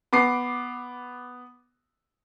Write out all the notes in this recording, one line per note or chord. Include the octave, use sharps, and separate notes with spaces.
B3 D6 C7